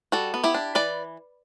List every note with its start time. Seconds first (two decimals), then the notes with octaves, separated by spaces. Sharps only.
0.12 G3 F#4 A4
0.34 B3
0.44 E4 G4
0.54 D4
0.75 E3 B4 D5